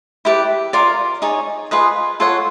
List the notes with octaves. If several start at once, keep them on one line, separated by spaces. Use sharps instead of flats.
E4 G4 B4 D5
F4 A#4 D5
D#4 G#4 C#5
F4 G#4 B4 D#5
F4 A4 C#5 F#5